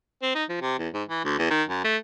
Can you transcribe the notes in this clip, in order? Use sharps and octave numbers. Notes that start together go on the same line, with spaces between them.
C4
D#4
F3
C3
E2
G#2
E3
D2
E2
D#3
F#2
A3